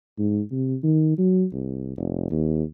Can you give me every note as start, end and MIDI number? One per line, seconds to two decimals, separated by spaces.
0.18 0.40 44
0.52 0.75 48
0.83 1.16 51
1.18 1.45 54
1.53 1.97 36
1.97 2.31 29
2.31 2.63 39